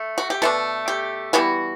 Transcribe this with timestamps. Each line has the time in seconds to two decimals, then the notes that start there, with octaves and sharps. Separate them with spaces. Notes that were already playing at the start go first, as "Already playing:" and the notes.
Already playing: A3
0.18 F#4
0.30 G4
0.42 B2 A3 D4 A4
0.88 G4
1.33 E3 G3 B3 F#4